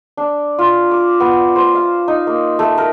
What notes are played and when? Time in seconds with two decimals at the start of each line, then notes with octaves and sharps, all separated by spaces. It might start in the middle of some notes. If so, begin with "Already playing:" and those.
0.17 D4
0.59 F4
0.91 D6
1.20 B3
1.56 C5
1.75 F5
2.08 D#4
2.27 A#3
2.59 A3
2.78 A#4